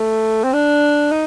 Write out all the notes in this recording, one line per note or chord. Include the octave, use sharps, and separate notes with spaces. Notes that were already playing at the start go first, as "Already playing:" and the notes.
Already playing: A3
C4
D4
D#4